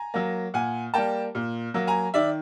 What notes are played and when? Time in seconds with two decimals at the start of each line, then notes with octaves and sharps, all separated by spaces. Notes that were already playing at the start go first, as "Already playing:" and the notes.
Already playing: G#5 A#5
0.14 F#3 A#3
0.54 A#2 F#5 G#5
0.94 G3 A#3 G5 A5
1.35 A#2
1.74 F#3 A#3
1.87 G#5 A#5
2.14 D#3 D5 E5